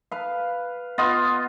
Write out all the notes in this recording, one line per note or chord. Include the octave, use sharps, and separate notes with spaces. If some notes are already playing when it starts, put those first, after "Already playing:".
B4 F5
B3 F4 D#5